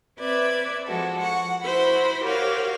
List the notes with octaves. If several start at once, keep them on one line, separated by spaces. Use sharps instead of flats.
C4 B4 D5 E5 G#6
F3 G#3 F#4 A4
F#5 C#6
E4 F#4 C5 B5
F#4 G4 A#4 C#5 F5